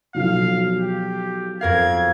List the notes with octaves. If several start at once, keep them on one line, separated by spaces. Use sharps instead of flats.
B1 F3 F#3 F5
G4
F2 A#4 F5 G#6